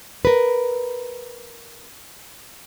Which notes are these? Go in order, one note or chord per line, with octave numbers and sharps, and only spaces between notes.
A#4 B4